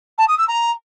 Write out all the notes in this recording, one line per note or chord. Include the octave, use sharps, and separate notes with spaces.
A5
D#6
E6
A#5